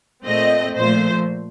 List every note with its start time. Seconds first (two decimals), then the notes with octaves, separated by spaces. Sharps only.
0.25 A#2 A3 C4 D#5
0.76 A#2 F3 A3 C5